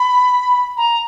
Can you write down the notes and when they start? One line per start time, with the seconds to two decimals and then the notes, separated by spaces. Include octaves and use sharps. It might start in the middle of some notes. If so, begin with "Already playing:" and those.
Already playing: B5
0.77 A#5